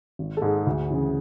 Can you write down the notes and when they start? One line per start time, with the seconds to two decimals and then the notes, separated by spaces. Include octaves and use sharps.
0.19 G#1
0.37 A4
0.42 G#2 G#3 G#4
0.67 D2
0.90 C#3 E3